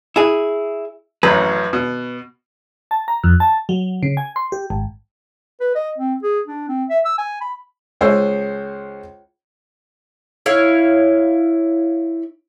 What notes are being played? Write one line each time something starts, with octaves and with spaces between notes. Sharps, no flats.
E4 G#4
A1 F#2 B4
B2
A5
A#5
F2
A5
F#3
C#3
G#5
C6
G4
G#1
B4
D#5
C4
G#4
D4
C4
E5
E6
G#5
B5
C#2 G#3 C5 C#5 G#5 E6
E4 C#5 F5